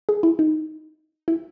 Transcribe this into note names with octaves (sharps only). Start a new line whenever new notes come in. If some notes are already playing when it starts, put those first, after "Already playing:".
G#4
E4
D#4
E4